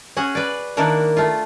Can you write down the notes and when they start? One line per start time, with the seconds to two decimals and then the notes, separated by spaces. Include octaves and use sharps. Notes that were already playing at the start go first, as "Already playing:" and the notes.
0.17 C#4 F#4 G#4 F#5
0.35 B4 D5
0.77 D#3 A#3 D4 E4 A#4 F#5
1.17 A3 F4